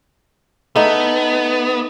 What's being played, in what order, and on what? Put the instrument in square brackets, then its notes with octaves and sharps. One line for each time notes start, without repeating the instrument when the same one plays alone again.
[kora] A3 D#4 [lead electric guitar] B3